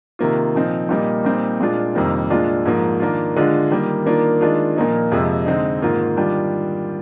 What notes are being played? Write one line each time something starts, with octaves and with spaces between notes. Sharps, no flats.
C3 D#3 A#3 F4
A#2 F3 C4 D#4
A#2 G3 A#3 D#4
A#2 G3 C4 D#4
A#2 G#3 D4 F4
F2 C3 D#3 G3 A#3
A#2 G#3 D4 F4
G#2 F3 A#3
D#3 A#3 D4 F4
D3 G#3 D4 F4
D#3 G3 A#3
D#3 A#3 D4 F4
D#3 G#3 D4 F4
A#2 F3 A#3 D#4
F2 C3 F3 G#3
D3 G#3 C4 D#4
G#2 D#3 A#3 F4
D#3 G3 D4 F4